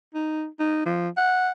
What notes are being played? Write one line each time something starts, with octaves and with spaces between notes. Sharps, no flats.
D#4
D#4
F3
F#5